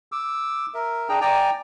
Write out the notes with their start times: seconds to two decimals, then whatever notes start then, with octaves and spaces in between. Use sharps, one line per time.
0.12 D6 E6
0.74 A#4 E5
1.09 D4 G#4 G5 A#5
1.21 D5 G5 G#5 A#5